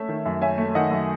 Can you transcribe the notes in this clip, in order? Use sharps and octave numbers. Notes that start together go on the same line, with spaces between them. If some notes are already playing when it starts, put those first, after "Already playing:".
Already playing: A3 C#4 E5
D#3
F#2
C#4 E5 G#5
A3
D#3 D#5 F#5
F#2